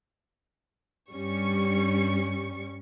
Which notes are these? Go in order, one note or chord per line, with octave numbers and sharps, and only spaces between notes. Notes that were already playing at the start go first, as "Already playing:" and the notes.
G2 G3 C#4 C#6 C#7